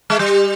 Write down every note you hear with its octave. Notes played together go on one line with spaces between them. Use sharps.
G#3
G3